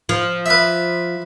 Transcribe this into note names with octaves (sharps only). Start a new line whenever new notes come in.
F3
B4 E5